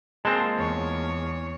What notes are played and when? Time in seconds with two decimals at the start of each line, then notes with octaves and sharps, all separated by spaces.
0.25 G#3 A#3 C4 F4 A5
0.57 E2 C#5